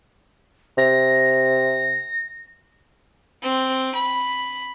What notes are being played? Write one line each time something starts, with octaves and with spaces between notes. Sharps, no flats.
C3 A#6
C4
B5